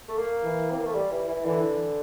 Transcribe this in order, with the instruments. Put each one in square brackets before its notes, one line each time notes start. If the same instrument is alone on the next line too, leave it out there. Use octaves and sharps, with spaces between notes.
[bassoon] A3
A#3
[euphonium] E3
[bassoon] C4
A#3
A3
G3
E3
E3
[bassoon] D3 [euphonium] E3